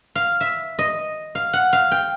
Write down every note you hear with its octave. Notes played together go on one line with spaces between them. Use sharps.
F5
E5
D#5
F5
F#5
F5
G5